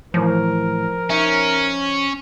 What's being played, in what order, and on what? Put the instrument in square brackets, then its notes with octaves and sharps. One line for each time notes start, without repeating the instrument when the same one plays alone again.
[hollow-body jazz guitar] A2 E3 E4 [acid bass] F3 [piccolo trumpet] A#4
[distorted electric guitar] C#4 [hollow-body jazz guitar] D#4 E5